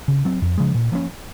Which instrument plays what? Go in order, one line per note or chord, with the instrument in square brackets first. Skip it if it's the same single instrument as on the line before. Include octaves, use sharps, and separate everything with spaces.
[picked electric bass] C#3
F#3 C4
F2
C#3 F3 G#3
A#2
F3 A#3 C#4